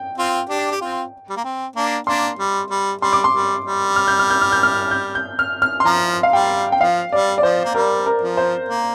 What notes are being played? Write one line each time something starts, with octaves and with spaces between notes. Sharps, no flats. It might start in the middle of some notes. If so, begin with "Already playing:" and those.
Already playing: G5
C4 F4
D4 G4
G4
C4 F4
G3
A#3
C4
A#3 D4
A#3 D4 C6
G3
G3
G3 C6
D6
C6
G3
G3
F6
G6
F6
G6
F6
G6
F6
G6
G6
F6
F6
C6
F3 A#5
F5
G3 G5
G5
F3 F5
G3 D5
D5
F3 C5
A#3
G3 A#4
A#4
F3
C5
A#3